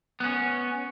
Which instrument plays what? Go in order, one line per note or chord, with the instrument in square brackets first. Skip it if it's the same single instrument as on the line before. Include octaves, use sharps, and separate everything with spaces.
[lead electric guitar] B3 C#4